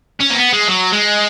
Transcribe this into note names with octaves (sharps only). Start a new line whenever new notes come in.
C#4
A#3
B3
G#3
F#3
G#3